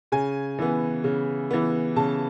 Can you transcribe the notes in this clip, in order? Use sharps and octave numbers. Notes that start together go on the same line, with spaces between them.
C#3 G#5
E3 B3
C#3
E3 B3
C#3 A5